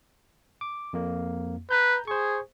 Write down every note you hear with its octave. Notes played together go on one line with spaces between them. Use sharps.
D6
F2 A#3
B4 A#5 G6
G#4 C5 C#6